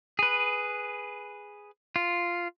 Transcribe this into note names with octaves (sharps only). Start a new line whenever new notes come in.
G#4 B4
F4